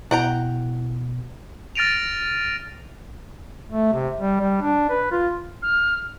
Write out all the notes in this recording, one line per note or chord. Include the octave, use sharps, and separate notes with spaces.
B2 E4 F#5 G5 A#5
F6 A6 A#6 D7 D#7 F7
A3
C3
G3
G3
D4
B4
F4
F6